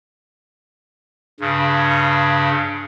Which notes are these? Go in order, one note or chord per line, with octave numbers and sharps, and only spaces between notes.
G2 C#3